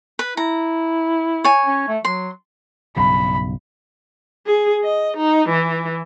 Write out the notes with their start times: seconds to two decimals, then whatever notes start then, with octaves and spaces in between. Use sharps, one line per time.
0.19 B4
0.37 E4 A#5
1.44 C#5 G#5
1.66 C#4
1.88 A3
2.05 F#3 C6
2.97 B1 G2 C#3 B5
4.47 G#4
4.84 D#5
5.17 D#4
5.49 E3